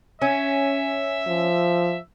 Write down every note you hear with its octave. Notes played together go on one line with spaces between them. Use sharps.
C#4 E5
F3